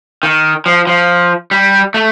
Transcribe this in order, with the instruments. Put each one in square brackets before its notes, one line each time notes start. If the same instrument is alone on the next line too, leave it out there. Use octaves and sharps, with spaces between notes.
[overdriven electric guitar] D#3
F3
F3
G3
A3